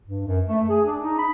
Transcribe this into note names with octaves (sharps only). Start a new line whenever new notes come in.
G2
F#2
A3
G#4
D4
D#4
B5